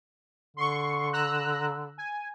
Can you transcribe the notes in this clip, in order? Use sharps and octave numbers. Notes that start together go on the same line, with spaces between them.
D3 C6 C#6
A#5 E6 F#6
G#5